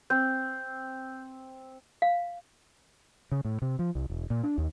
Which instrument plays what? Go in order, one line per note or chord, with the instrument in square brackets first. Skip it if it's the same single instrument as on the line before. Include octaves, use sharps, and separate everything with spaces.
[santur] C4 [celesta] G6
[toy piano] F5
[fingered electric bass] C#3
A2
C3
F3
C2
E1
A#2
D4
D#2